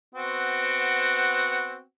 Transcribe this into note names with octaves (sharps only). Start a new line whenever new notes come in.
B3 C4 F#4